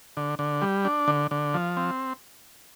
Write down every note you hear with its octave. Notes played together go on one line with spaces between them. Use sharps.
D3
D3
G3
D4
D3
D3
F3
C4